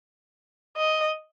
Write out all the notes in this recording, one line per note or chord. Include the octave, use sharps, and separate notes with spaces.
D#5